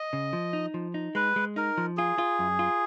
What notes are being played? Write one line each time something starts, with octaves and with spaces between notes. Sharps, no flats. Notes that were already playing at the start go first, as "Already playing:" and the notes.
Already playing: D#5
C#3
F3
D#4
F3
D#4
G#3 B4
G#3
D#4 A#4
F3
F4 G#4
F4
F#2
F4